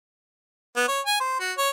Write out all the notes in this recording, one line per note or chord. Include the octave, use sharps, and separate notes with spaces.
B3
C#5
G#5
C5
F#4
C#5